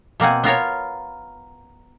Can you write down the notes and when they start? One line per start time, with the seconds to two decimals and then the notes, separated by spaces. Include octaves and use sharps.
0.20 B2 A#3 C4 F#5 G#5
0.43 B3 F4 A#4 C#5